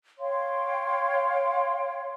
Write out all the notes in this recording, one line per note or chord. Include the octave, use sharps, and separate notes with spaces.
C#5 F5 G5 C6